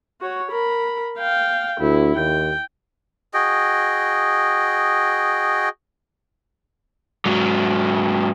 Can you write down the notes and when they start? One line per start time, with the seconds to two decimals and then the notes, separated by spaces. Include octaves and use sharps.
0.21 F#4 C#5
0.51 A#4 B5
1.19 F5 G5
1.80 D2 E4
2.16 D#2 G5
3.34 F#4 G#4 D#5 G5
7.26 G#2 F#3